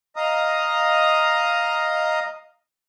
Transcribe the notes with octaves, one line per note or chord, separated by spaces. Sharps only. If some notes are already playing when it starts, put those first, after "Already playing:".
D#5 F5 A#5 D#6